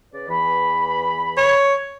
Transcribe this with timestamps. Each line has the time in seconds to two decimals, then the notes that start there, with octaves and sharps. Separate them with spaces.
0.12 C#3 B4 D5
0.29 E2 E3 B5
1.37 C#5